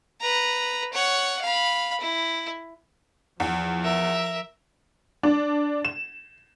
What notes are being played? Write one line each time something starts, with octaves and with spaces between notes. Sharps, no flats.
B4 A#5
C#5 F#5
F5 B5
E4
E2 F3
A#4 E5
D4
E7